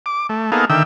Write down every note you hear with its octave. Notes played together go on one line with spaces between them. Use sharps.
D6
A3
A#3 B3 D#4 G#4 A4 F5
D3 D#3 E5 G5 E6